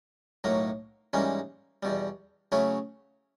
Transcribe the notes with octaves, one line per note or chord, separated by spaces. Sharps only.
B1 A2 F#3 A#3
G#2 E3 G3 A#3 C#4
E2 B2 G3
C#3 F#3 A3 C#4 E4